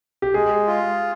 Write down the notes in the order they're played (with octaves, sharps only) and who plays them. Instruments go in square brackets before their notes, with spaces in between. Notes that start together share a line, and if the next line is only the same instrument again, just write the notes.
[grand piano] G4
[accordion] G#3 [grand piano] G#4
[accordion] F4